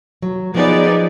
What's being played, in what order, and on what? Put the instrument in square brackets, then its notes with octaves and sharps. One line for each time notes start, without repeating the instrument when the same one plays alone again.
[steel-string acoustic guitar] F#3
[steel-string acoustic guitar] F3 [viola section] B3 D#4 G#4 B4 D5